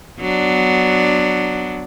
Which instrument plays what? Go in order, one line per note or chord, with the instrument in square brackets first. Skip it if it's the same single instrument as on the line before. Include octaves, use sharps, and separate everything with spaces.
[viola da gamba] F#3 B3 D4